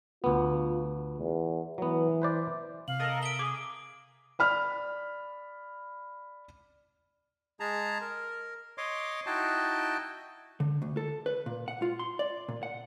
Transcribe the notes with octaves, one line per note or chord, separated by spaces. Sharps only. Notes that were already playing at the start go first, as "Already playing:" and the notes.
D2 B3 F4
E2
E3 F#3 B3
B4 C5 D5
C3 F5 F#7
A4 A#4 D#5
E5 D#6 D7 G7
G#4 D6
D5 B5 F6
G#3 G#4 A5 A#5
A#4
C#5 D#5 C6 D6
D#4 E4 F#4 D#5 G5 A5
D3
D2
A4
B4
A#2
F#5
F4
C6
D5
A#2
F#5